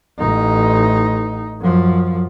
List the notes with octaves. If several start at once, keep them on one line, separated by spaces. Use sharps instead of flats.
A1 D#4
F#2 F3